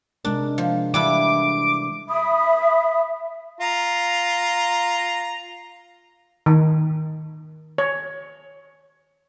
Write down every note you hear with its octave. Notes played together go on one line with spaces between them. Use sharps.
C3 G#3 D4 A#4
F3
E3 G3 D4 E4 D6
E5 B5 D#6
F4 A#5
D#3
C#5